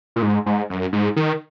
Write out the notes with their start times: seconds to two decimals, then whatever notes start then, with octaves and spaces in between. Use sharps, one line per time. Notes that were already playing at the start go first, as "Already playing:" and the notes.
0.16 A#2
0.22 G#2
0.46 G#2
0.70 F#2
0.93 G#2
1.16 D#3